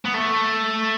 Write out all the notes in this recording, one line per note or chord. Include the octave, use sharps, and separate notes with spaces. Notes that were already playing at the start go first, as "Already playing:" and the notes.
B3
A3